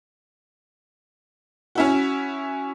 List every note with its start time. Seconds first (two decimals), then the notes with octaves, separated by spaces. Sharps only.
1.75 C#4 E4 F#4